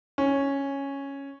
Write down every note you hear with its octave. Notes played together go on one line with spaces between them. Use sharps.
C#4